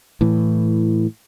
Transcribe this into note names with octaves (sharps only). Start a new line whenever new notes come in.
A2 E3